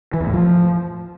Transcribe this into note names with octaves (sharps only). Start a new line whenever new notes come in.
E3
E2
A2
F3